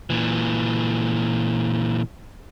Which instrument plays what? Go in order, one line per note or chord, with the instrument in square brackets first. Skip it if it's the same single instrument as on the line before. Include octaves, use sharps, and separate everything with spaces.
[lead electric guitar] A#2 E3